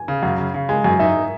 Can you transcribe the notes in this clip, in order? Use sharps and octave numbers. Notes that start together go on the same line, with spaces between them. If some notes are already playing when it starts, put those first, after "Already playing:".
Already playing: G#5
C#3
F#2 F#5
C#3
C#3
G#3 G#5
F#2 G#5
D#4 E5